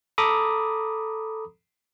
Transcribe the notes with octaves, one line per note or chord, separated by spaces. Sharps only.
A4 A#5 B5 D6 D#6